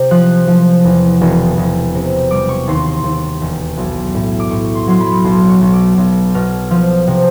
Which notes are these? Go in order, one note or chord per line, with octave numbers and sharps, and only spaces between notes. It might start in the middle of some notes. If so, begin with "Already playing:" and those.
Already playing: C3
F3 F#6
F3
E2
E1
E1
C3
G3 D6
C#6
D#2 C6
C6
D#2
E1
B1
A2
D6
A2 C#6
C6
F#3 C6
B5
B1 C6
C#6
B1
D6
B1
B2 F6
F3 F6
C3